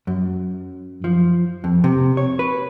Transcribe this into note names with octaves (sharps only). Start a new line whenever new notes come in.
F#2
F3
F2
C3
C#5
B4